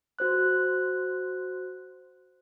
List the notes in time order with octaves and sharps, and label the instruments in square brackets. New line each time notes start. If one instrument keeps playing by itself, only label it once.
[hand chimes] F#4 C5 F#6